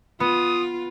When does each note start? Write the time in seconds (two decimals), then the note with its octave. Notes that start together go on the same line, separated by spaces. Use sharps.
0.20 B3 F4 D#6